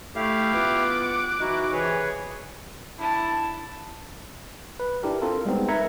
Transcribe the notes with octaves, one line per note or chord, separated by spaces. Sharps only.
A3 E4 G4 F5
B3 F4 D6 F#6
F#5
E3 D#4 E4 F#4
C3 E3 G#4 B4 C#5
D4 E4 A5
B4
D4 E4 G4 A#4
C4 F4 A4 A#4
G3 G#3 B3 C4 D#4
A#4 B4 E5 A#5 G#6 C#7